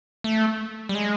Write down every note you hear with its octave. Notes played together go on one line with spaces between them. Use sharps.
A3
G3
G#3